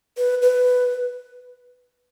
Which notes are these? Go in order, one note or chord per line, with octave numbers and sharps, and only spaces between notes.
B4
B4